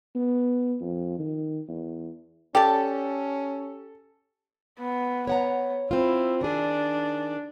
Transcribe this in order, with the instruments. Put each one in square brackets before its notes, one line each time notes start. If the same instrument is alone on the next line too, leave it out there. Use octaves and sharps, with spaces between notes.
[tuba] B3
F2
D#3
E2
[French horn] C#4 [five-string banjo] G4 [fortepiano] A4 [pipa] D5 A5
[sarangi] B3
[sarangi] B3 [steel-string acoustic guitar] C#5 F#5 A#5
[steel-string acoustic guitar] C4 F4 [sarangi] E4
[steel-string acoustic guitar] D#3 G#4 [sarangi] D4